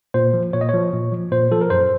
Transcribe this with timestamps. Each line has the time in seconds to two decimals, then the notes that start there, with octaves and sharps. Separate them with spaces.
0.14 A#2 C5
0.34 F3
0.53 A#2 C#5
0.61 D#5
0.69 F3 C#5
0.93 A#2
1.12 F3
1.31 A#2 C5
1.51 F3 A4
1.61 A#4
1.70 F#2 C5